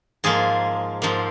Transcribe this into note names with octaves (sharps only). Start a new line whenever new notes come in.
G#2 F3 A#3 G#4
G#2 F3 A#3